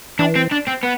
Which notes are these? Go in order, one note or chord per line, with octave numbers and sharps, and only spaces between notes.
E3 D4
C4
D4
C4
B3